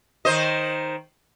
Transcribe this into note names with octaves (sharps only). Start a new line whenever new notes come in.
D#3 C5 D#5